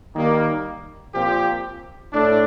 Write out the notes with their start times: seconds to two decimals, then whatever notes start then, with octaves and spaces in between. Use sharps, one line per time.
0.15 D#3 G3 A#3
1.13 A#2 F3 C4 G4
2.12 A2 A3 D4